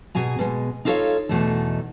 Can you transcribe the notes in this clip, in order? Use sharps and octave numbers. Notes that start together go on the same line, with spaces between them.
B2 G#4 G#5 A#5
B2 G#3
D#4 F4 A4 A#4 C#5 F5
E2 B2 A3 D#4 A4